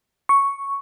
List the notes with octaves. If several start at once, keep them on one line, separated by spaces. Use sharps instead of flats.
C#6